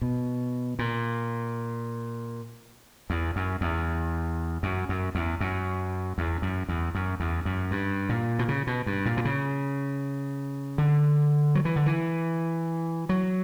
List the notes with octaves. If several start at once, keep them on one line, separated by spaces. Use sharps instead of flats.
B2
A#2
E2
F#2
E2
F#2
F#2
E2
F#2
E2
F#2
E2
F#2
E2
F#2
G2
A#2
B2
C#3
B2
G2
A#2
B2
C#3
D3
F#3
E3
D3
E3
F#3